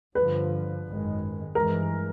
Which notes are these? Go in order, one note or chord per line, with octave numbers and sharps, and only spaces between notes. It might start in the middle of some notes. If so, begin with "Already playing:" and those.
G2 D3 F3 B4
G#1 F#2 D#3 G#3
G2 E3 G#3 A#4